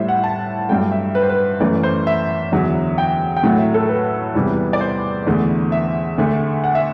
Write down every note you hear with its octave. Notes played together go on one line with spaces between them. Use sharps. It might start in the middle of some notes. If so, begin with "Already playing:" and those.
Already playing: A2 G3 C5 E5
F#5
A5
G2 F#3 A3 G5
E5
B4
C5
B4
F#2 E3 A3 D5
C5
E5
E2 D3 F#3
G5
G5
A2 F#3 A3 F#5
E5
A4
B4
E2 C3 E3 G3
D5
C5
E2 D3 A3
E5
D2 D3 A3
F#5
E5